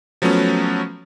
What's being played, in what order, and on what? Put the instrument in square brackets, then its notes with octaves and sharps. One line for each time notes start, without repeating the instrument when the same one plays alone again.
[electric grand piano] F3 F#3 A3 B3 C#4